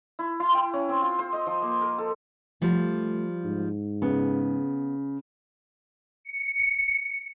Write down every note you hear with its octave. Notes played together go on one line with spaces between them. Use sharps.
E4
E4
G5
C#4
C4
F4
C5
D#5
F3
A#3
A#4
A4
F3 G3 A3
G#2
C#3 B3
C#7